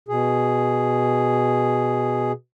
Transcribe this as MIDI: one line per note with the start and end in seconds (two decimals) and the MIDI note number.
0.08 2.32 47
0.08 2.32 68